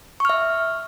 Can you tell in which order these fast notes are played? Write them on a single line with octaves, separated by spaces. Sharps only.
C#6 F6 E5